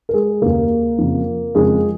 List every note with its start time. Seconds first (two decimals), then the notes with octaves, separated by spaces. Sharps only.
0.09 A#4
0.13 G#3 G#4
0.42 D#2 C#3 A#3 A#4
0.98 F2 C#3
1.55 F2 C#3 G#3 G#4